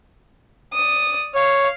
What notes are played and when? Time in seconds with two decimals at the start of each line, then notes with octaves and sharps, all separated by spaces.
0.74 D5 D#6
1.35 C#5 F5